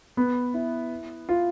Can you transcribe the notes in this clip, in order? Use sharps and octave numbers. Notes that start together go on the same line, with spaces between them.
B3
E4
F4